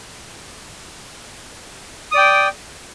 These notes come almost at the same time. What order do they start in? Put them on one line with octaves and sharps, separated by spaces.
D#6 D5 G5